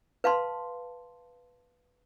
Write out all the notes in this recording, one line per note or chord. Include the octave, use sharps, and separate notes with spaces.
B4 F5 A5 C6